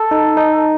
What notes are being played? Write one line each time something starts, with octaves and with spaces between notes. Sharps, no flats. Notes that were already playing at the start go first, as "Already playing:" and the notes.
Already playing: A4
D#4
D#4